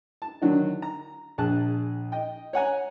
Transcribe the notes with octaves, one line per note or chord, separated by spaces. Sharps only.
A5
D3 D#3 F#3 D4
A#5
A#1 G#4 A5 F#6
D#5 G5
C#5 F#5 G#5 A#5